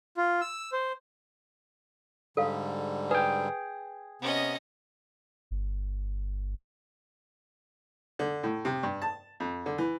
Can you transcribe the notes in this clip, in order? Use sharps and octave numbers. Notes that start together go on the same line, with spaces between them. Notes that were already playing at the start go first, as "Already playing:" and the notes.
F4
E6
C5
G#2 D3 G3 A4 F5
G#4 B4 G5
C3 B3 C#4 D#5
G1
D3
A2
C3
G2
A5
F2
D3
E3